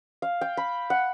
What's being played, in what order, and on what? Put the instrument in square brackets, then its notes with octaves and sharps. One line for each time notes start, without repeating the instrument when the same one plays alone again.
[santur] F5
G5
B5
F#5